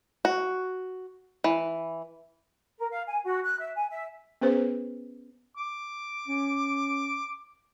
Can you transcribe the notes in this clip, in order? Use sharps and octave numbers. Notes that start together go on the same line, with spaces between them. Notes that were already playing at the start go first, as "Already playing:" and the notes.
F#4
E3
A#4
F5
G#5
F#4
F#6
E5
G#5
E5
B3 C#4 G#4 B4 C5
D6
C#4